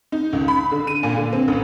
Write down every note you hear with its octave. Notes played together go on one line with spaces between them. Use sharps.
D#4
C#2
B5
D3
D#7
A#2
D3
C4
A1